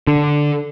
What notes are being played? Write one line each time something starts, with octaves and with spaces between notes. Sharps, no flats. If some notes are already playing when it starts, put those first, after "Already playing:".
D3